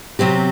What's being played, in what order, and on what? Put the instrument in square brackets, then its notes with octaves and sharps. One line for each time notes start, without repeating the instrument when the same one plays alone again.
[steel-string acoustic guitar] C3 F#3 C4 G4